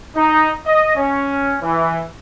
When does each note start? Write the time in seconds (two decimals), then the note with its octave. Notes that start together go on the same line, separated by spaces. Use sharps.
0.16 D#4
0.66 D#5
0.96 C#4
1.62 E3